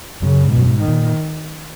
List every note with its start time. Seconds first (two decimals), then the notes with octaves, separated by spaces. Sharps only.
0.22 F#2 C#3
0.44 G#2
0.51 F#2 B2
0.66 G#2
0.81 D#3
0.88 A#2